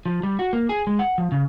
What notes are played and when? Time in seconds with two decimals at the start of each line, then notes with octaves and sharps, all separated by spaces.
0.06 F3
0.23 G3
0.39 F#4
0.53 A#3
0.69 G#4
0.87 G#3
0.99 F#5
1.18 F3
1.32 C#3